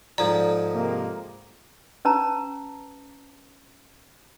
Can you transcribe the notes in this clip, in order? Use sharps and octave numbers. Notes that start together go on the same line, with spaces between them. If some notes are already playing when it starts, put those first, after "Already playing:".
G#2 F3 A4 C5 D5 A#5
C3 G#3 A#3
C#4 B4 A5 A#5